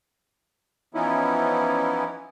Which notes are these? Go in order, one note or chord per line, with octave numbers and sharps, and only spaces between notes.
E3 F3 B3 C#4 D#4 E4